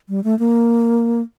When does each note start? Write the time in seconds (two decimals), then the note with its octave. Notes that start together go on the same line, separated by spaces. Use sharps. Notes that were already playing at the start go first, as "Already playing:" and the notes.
0.09 G3
0.24 A3
0.39 A#3